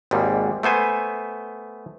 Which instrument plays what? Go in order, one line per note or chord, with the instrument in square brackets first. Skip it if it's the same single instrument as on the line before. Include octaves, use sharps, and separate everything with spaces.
[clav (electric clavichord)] G#1 D#2 G#2 G3
A3 B3 C5 G#5